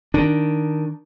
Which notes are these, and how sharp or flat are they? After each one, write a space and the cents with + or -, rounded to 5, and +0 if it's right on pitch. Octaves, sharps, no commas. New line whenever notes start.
D#3 +0 D4 +0